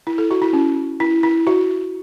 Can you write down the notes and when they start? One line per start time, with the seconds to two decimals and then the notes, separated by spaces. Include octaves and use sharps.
0.07 E4
0.18 A4
0.31 F#4
0.42 E4
0.53 C#4
1.00 E4
1.23 E4
1.47 F#4